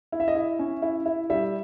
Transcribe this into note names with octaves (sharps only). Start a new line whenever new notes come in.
E4
E5
D#5
E4 E5
C#4
E4
E4
G3 E5